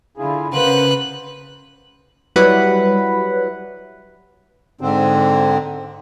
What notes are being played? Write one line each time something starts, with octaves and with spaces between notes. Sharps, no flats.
D3 E4 F4 G#4
C#3 A#3 B4 C5 F#5 F#6
F#3 G3 E4 B4 F#5 B5
G#2 D3 C4